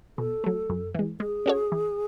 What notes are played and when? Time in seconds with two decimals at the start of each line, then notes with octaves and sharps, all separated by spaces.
0.18 B2 A4
0.44 F#3 A3
0.70 F#2
0.95 E3 G#3
1.20 G#3 G#4
1.46 C#4 F#4 A4 C#5
1.72 E3